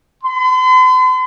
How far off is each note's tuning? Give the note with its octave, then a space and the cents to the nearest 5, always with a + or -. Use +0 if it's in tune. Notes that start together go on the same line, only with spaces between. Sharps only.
C6 -45